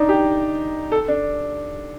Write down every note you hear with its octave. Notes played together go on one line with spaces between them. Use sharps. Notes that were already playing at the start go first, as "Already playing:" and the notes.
Already playing: D4 D#4
G4
A4
D4